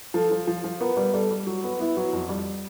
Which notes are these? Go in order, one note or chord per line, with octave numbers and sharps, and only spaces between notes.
F3 A4
F3
F3
F3
B3 A#4
G3
G3 A4
G3
F#3
B3
B3 E4
F#3
F2
G3